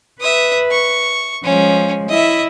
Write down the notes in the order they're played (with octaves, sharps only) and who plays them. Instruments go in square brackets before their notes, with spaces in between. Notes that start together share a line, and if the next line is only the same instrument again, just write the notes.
[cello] B4 [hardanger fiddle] E5 D#6
[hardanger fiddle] C#6
[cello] F3 G#3 [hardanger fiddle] C#4
[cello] E4 [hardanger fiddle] D#5 E5